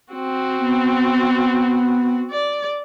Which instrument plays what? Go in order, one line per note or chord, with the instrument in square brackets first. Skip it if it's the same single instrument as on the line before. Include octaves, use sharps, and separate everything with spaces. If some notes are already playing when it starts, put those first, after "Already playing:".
[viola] C4 F#4
[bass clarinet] B3
[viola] D5